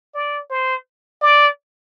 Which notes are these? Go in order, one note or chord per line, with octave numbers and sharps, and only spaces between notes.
D5
C5
D5